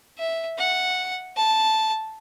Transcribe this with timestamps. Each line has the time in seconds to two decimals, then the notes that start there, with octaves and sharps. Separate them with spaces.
0.18 E5
0.58 F#5
1.36 A5